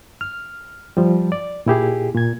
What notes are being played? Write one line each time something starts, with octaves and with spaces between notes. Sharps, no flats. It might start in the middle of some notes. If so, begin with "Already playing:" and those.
F6
F3 G3
D5
A#2 E4 G4 G#4
A#2 G#6